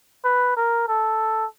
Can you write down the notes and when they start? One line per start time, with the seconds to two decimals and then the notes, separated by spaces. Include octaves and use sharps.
0.24 B4
0.57 A#4
0.88 A4